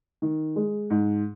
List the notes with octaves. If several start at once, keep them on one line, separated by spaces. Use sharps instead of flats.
D#3
G#3
G#2